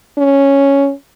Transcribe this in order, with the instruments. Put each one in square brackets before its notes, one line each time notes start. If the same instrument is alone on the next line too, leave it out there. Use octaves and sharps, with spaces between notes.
[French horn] C#4